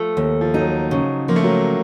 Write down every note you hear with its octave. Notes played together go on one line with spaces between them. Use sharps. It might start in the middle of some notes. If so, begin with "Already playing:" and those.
Already playing: F3 A3
D#2
F3
F#3 D#4
C#3
F3 A#3
A3
F#3 A#3